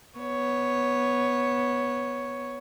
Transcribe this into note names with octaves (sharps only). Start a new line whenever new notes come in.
B3 C#5